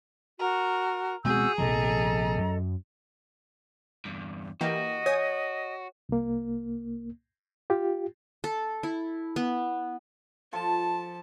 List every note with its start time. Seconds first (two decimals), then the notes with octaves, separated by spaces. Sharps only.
0.39 F#4 A#4
1.25 B2 G#3 C4 F#4 G#4 E6 G6
1.58 A#1 C3 F3 A4 D#5 A#5
2.38 F#2 F#3
4.05 E2 G2
4.61 E3 A#3 F#4 G4 D#5
5.06 C#5 G#5 D#6
6.09 C2 A#3
7.70 F4 G4
8.44 A4
8.83 E4
9.36 B3
10.53 F3 A4 A5